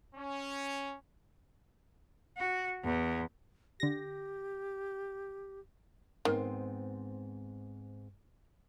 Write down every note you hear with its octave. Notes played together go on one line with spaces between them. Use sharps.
C#4
F#4
E2
D3 G4 A#6
G#2 D#3 B3 C4